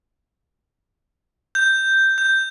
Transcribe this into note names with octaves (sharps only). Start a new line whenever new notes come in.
G6
G6